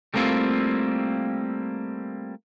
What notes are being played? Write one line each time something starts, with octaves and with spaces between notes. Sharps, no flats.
G3 A3 A#3 C4 E4 F4